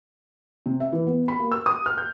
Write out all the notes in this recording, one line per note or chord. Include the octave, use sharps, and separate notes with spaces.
C3
E5
E3
B3
B5
A#3
E6
D#6
F6
G6